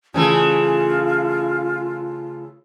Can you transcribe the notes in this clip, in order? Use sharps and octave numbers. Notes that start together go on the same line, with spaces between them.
C#3 E3 A3 F4